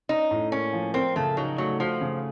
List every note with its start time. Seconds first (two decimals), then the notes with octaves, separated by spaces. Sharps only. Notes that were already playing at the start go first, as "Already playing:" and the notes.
0.09 C#4 D#4
0.31 A2
0.52 A#3 C#4
0.73 F3
0.94 C4 A#4
1.16 C#3 A3
1.37 F#3 D#4
1.58 F#3 A3
1.80 F3 F#4
2.01 C#3